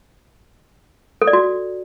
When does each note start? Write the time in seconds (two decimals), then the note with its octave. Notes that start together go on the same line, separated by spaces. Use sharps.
1.22 A4
1.27 D5
1.33 F#4